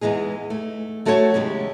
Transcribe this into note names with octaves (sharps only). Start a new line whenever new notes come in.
E2 E3 G#3 D#4 G#4
A3
F#3 A3 F#4 A4 C5 C#5
E2 C#3 G#3 G4